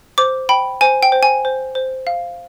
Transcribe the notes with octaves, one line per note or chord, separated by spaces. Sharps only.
C5 D6
G5 B5
C5 G#5
G5
C5
G#5
C5
C5
F5